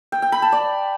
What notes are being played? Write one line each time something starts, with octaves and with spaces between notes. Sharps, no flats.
G5
G5
B5
A5
D5